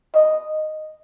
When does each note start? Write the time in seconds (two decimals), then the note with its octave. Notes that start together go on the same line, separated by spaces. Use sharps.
0.15 D#5